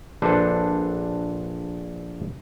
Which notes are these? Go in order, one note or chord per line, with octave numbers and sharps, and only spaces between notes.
A#1 D4 A4 B4 C5